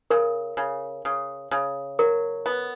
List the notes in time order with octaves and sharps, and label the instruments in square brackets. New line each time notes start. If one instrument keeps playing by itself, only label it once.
[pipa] C#3 [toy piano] A#4
[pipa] C#3
C#3
C#3
[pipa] F#3 [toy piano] A#4
[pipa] B3